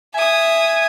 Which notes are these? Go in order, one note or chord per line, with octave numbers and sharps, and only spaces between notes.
E5 G#5 D#6